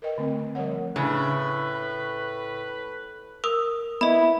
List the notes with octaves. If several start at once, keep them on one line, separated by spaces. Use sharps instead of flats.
A#4 B4 D#5 G5
D3 A3 C4
F3 G3 C4 A#4 C#5 F#5
A2 C#3 B4
A#4 D#6 E6
B3 E4 D#5 B5